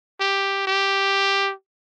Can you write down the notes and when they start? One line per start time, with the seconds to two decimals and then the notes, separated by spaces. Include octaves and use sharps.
0.20 G4
0.67 G4